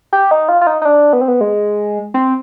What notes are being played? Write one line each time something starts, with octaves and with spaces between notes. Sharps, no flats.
G4
D#4
F4
F4
D#4
D#4
D4
B3
C4
B3
G#3
C4